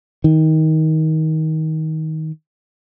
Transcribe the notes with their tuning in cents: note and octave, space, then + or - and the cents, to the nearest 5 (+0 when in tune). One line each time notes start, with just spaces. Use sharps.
D#3 +20